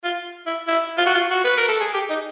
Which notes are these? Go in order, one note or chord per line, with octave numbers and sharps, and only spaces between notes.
F4
E4
E4
F4
F#4
F4
F#4
B4
A#4
A4
G#4
G4
D#4